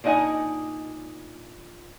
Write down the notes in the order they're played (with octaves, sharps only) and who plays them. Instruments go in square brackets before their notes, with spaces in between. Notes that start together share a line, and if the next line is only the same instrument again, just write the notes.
[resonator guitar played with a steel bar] A#2 D4 D#4 D#5 F#5 G#5